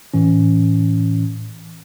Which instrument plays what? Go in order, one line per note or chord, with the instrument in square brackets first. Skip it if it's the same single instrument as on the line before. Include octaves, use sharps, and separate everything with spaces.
[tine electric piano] A2 E3 C#4